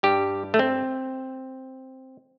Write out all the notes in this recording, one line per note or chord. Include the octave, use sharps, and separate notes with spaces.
G2 G3 G4
A3
C4